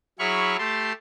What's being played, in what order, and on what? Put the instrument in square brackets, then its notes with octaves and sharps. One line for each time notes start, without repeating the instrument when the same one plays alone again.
[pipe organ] F#3 E4 G#4 B5 C#6 F6
A3 G4 A5 C6